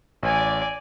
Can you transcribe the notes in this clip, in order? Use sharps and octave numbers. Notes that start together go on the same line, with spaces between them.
A1 D5 G#5